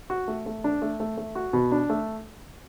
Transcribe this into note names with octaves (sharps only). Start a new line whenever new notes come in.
F#4
A3
A3
D4
A3
A3
A3
F#4
B2
D4
A3